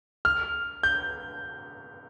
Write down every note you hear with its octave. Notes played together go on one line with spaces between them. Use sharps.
F6
G6